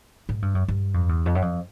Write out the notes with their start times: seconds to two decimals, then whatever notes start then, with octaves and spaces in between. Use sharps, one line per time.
0.29 G#2
0.42 G2
0.55 F#2
0.68 G2
0.94 F2
1.09 E2
1.26 F2
1.35 F#2
1.42 F2